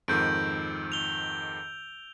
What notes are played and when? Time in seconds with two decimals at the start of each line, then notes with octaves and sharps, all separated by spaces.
0.08 F2 G#2 D#3 E6 G6 D7
0.92 F7 G7